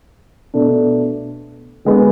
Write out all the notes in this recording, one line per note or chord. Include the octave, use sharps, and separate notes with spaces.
B2 A3 D4
D3 G#3 B3